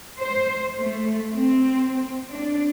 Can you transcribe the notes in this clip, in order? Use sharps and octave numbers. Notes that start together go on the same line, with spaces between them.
C5
A3
C4
D4